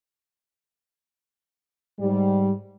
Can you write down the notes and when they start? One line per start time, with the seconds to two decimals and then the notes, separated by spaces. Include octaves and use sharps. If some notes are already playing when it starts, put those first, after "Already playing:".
2.00 G#2 G3